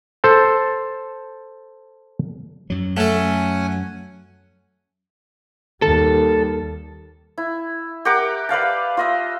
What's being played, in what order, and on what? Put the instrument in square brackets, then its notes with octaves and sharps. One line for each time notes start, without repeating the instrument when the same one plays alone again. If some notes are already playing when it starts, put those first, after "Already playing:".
[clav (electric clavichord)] A4 C5 A5
[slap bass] F#2 F#3
[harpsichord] A3 A4 [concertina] C#4 F#5 G#5
[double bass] D#2 G3 [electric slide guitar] A4
[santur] E4
G4 A#4 F#5 D6
B4 D5 F5 A5
F4 D#5 E5